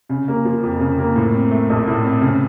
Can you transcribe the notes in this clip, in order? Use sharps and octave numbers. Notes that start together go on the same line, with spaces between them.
C#3
A#3
F3
F2
C#3
A#3
A2
C4
A3
A#1
A2
C4
C#3